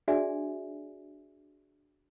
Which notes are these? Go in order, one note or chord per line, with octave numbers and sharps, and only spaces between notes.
D4 F#4 G#4 D5 E5 G#5